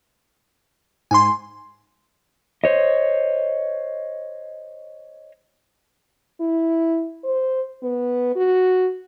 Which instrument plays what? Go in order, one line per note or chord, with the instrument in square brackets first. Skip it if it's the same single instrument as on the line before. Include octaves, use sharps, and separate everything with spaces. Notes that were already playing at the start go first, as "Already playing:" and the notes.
[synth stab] G#2 [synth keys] G#5 C6
[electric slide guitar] C5 C#5 D#5
[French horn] E4
C5
B3
F#4